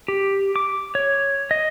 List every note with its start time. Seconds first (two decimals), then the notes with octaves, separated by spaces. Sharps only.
0.08 G4
0.56 D6
0.95 C#5
1.51 D#5